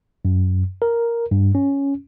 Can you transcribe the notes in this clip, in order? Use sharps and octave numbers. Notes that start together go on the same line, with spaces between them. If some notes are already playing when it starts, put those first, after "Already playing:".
F#2
A#4
G2
C#4